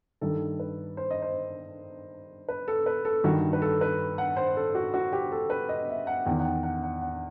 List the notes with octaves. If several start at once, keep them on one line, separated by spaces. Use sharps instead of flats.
G2 D#3 A4
B4
C5
D#5
C5
B4
A4
B4
A4
G2 D#3 F#4
B4
A4
B4
F#5
C5
A4
F#4
F#4
G4
A4
B4
D#5
E5
F#5
E2 D#3 G5
F#5
G5
F#5
F#5
F#5